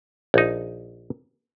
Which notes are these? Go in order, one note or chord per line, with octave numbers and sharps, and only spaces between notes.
A#1 D#4